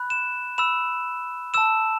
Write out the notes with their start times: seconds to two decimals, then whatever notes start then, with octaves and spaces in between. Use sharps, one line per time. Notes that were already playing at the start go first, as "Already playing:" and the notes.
Already playing: B5 F#6
0.10 E7
0.58 B5 E6 E7
1.54 A5 E6 E7